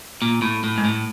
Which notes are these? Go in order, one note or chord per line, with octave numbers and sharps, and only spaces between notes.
A#2
A2
A2
G#2
A2